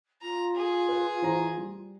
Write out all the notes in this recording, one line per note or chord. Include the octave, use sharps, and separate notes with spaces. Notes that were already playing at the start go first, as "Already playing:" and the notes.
F4 A#5
G#4
B4
E3 C5 A#5
G3